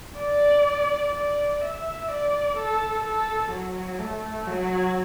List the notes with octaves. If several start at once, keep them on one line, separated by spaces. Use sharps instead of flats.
D5
D5
E5
D5
A4
A4
F#3
A3
F#3